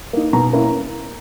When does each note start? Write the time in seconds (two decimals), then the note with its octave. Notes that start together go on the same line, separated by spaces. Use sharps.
0.13 A#3 D#4
0.33 B2 A#5
0.53 A#3 C#4 E4